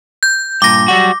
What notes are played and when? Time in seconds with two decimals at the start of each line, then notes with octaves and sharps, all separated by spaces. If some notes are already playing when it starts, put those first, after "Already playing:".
0.23 G6
0.62 G2 A#2 D6 A#6
0.88 F#3 G3 F#4